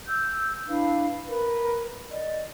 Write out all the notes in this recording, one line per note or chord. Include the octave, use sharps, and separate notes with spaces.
E6 G6
D4 E4 B4 F5
A#4 B4
D5 D#5